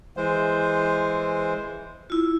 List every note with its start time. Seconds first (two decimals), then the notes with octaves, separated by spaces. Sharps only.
0.17 E3 G#3 C5
2.10 E4 F4